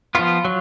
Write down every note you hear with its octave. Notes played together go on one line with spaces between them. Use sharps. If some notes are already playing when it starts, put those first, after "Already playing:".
F3 B3 F4
F#3